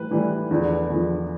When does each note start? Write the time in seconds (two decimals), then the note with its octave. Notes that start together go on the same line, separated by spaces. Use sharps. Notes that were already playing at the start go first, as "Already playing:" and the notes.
Already playing: A2 E3 G3 B4
0.11 A2 E3 G3
0.51 E2 D3 F3
0.90 E2 D3 F3